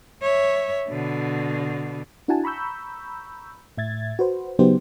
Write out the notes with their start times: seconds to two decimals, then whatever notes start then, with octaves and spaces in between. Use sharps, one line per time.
0.22 C#5 E5
0.89 B2 D3
2.28 D4 E4 F#4 F#5 G#5 A5
2.44 A#5 B5 C#6 E6 G6
3.77 A2 E5 G#6 A6
4.19 F#4 B4 C5
4.59 C#3 F#3 B3 D#4 G4 C5